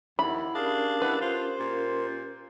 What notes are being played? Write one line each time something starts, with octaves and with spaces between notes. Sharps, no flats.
D#2 E4 F#5 B5
C#4 D4 G4 G#4 A#4 F5
E4 B4 E5 F#5
F4 C5
A#2